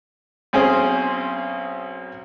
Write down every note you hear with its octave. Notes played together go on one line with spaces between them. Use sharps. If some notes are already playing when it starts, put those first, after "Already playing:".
B1 C4 C#4 G#4 C5